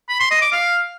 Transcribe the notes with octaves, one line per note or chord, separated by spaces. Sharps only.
B5
C6
D#5
D6
F5